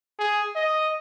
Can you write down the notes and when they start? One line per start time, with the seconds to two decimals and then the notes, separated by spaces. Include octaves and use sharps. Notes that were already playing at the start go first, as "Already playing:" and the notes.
0.19 G#4
0.55 D#5